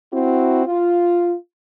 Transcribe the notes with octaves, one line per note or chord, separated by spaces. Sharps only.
C4 E4 F#4
F4